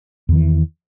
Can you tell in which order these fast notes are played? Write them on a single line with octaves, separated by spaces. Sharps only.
E2 D#3 E3